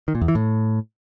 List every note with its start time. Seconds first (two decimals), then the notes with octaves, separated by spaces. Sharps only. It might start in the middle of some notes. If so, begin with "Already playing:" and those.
0.08 D#3
0.15 A#2
0.22 E2
0.28 E3
0.35 A2